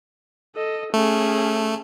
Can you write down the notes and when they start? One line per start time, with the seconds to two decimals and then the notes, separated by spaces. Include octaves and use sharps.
0.56 A4 D#5
0.94 A3 C#4 G#4